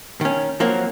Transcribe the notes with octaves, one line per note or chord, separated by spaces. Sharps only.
D#3 C#4
F3 F#3 A#3 C4